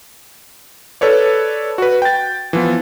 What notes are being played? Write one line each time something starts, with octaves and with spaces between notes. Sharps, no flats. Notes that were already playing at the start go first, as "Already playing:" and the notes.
A4 B4 C#5 D5
F#4 B4
G5 A6
E3 F3 B3